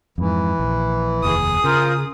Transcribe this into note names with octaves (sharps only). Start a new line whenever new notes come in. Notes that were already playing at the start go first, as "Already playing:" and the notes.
F2 G#2 E3
A#1
F1 D#2 G#4 D#6
C#3 F4 A#4 C5